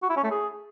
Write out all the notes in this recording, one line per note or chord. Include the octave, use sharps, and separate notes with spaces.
F#4
E4
C#4
A3
G#4